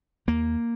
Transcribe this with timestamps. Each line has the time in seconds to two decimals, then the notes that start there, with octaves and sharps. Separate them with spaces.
0.27 D#2 A#3